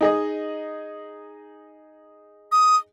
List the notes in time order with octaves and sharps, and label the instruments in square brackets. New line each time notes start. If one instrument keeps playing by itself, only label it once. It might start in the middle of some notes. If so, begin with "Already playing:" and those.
[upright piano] D#4 G#4 D#5
[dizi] D#6